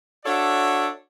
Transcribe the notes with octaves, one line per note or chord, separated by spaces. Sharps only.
D4 F#4 A4 C#5 D5 E5